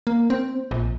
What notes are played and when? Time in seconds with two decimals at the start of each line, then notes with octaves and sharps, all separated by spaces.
0.07 A#3
0.30 C4
0.71 A#1